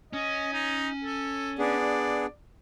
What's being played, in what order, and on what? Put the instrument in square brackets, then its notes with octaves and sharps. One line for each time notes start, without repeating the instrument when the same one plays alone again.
[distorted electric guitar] C#4 [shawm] D#5
[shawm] D#4
A4
[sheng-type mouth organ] B3 D4 G#4 [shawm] D5